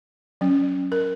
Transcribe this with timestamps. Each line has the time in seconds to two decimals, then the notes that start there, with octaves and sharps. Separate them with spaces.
0.41 F#3 C#4
0.92 A#4